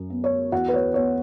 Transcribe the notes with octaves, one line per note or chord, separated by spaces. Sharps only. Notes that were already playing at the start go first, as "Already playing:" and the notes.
Already playing: F#2
B3
C#5
E2 F#4 F#5
B4
C#5
B3 C#5